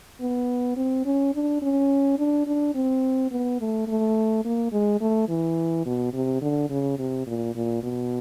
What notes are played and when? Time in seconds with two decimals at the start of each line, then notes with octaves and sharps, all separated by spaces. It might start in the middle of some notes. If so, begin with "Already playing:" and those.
0.21 B3
0.77 C4
1.06 C#4
1.35 D4
1.62 C#4
2.19 D4
2.47 D4
2.75 C4
3.31 B3
3.60 A3
3.88 A3
4.45 A#3
4.72 G#3
5.01 A3
5.29 E3
5.86 B2
6.13 C3
6.42 D3
6.70 C#3
6.99 C3
7.27 A#2
7.55 A#2
7.83 B2